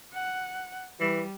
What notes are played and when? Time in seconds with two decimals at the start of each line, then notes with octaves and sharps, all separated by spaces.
0.13 F#5
1.00 E3 G3